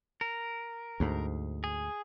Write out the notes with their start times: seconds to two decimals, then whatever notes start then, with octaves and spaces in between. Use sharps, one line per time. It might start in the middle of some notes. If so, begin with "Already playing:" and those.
0.21 A#4
1.00 D2 G#2
1.64 G#4